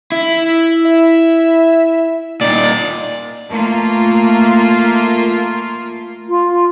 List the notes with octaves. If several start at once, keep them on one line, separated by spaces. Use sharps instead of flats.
E4
E5
A#2 D#4 D5
A3 A#3 F4
F4